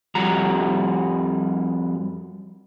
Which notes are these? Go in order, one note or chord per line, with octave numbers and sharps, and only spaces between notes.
F2 G3 F#4 A#5